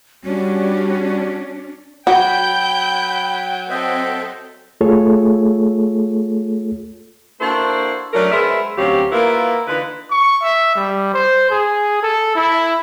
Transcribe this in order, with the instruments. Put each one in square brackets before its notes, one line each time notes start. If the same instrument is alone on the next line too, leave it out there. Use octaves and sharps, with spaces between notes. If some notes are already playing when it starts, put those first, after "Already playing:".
[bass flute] G3 [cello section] C#4 D4 [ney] F#4
[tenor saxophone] F#3 [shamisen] F#4 [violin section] G5 G6 [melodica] B5
[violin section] C4 A4 [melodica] D#5 E5 G5
[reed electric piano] A3 F4 G#4 A4 C#5
[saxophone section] A#3 D4 E4 F#4 A4 C5
F#3 A3 C#4 D4 A#4
G#3 B3 A#4 C5 E5
D2 C3 F#3 C#4 G4 F5
A#3 B3 E4 F4 A#4 B4
D3 E3 D#4 F4 B4
[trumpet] C#6
E5
G3
C5
G#4
A4
E4